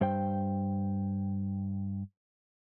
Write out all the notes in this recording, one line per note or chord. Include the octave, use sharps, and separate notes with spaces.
G2 C5 G5